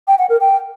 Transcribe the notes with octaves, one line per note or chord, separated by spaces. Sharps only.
G5
F#5
A#4
G5